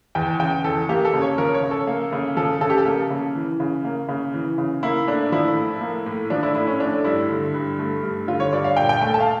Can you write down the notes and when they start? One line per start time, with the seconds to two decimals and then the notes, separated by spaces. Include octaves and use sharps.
0.15 E2 G5
0.40 C#3 G5
0.64 E2 A4
0.89 A#3 G4
1.05 A4
1.13 C#3
1.22 C#5
1.38 F3 A#4
1.54 C#5
1.63 C#3
1.71 A4
1.87 A#3
2.13 C#3
2.37 F3 A4
2.61 C#3 A4
2.70 G4
2.78 A4
2.86 A#3
3.11 C#3
3.35 E3
3.60 C#3
3.85 A#3
4.09 C#3
4.34 E3
4.58 C#3
4.83 A#3 E4
5.07 A2 D4
5.32 F3 E4
5.57 A2
5.81 A#3
6.06 A2
6.30 F3 D4
6.43 E4
6.55 A2 E4
6.67 C#4
6.80 A3 D4
7.04 G2 E4
7.29 D3
7.54 G2
7.79 A3
8.03 G2
8.27 D3 F4
8.40 C#5
8.52 G2 D5
8.64 F5
8.77 A#2 G5
8.89 G5
9.01 A3 G5
9.14 A5
9.20 F5